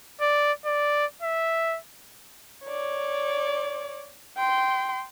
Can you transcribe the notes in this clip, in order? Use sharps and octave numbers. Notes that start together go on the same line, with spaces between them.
D5
D5
E5
C#5 D5
G5 C6